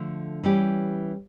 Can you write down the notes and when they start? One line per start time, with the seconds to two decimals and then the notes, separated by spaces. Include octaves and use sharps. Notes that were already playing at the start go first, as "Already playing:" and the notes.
Already playing: D3 F3 A3
0.43 E3 G3 C#4 G4